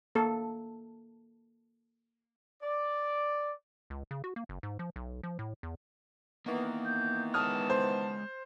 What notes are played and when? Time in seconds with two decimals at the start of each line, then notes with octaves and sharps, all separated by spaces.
0.15 A#3 A4
2.62 D5
3.90 C#2
4.11 C#3
4.24 F#4
4.36 A#3
4.49 F#1
4.63 G#2
4.79 F3
4.96 B1
5.23 F3
5.39 A2
5.63 E2
6.46 D#3 E3 A#3 B3
6.85 G6
7.34 G#3 G#4 C#5 A5 D#6 F6
7.70 C5